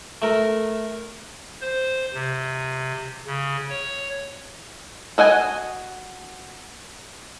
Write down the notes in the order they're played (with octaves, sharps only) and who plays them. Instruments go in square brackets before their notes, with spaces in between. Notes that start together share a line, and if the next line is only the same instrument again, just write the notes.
[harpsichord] A3 A#4
[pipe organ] C5
C3
C#3
C#5
[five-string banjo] F#4 D#5 F#5 G#5